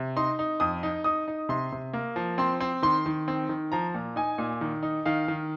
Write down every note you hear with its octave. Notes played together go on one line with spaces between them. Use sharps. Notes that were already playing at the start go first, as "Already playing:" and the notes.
Already playing: C3
D#4 C6
D#4
F2 D#6
D#4
D#4 D#6
D#4
C3 C6
C3
A#3
F3
C4 C6
C4
D#3 C6
D#3
C4
D#3
F3 A#5
A#2
D#4 G#5
A#2
D#3
D#4
D#3 F5
D#3